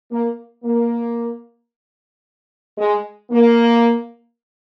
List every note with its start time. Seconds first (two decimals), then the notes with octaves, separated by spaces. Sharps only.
0.10 A#3
0.64 A#3
2.77 G#3
3.30 A#3